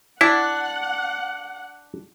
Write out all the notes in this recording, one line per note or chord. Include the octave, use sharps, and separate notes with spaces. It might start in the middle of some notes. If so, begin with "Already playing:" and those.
D4 E4 F#5